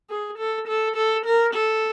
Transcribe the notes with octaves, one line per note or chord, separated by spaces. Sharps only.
G#4
A4
A4
A4
A#4
A4